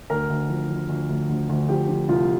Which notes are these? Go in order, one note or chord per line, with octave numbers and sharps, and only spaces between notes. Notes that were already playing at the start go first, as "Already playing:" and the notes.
D2 A#4
D2
F3
F3
D2
D2
D2
D2
F3 G4
F3
C2 F4